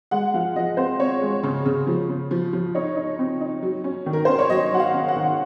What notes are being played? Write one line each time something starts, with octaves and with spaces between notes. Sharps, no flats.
G#3 F#5
F3 F5
F3 D#5
C4 C5
C4 C#5
G#3
C#3
C#3
F3
C#3
F3
F3
D#4 C#5
D#4
C4
D#4
F#3
C#4
D#3
A#4
C#4 C5
C#5
F#3 D#5
F#3 F#5
F5
C#4
F#5
D#3